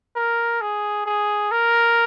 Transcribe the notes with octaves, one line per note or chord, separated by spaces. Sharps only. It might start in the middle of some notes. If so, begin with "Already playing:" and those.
A#4
G#4
G#4
A#4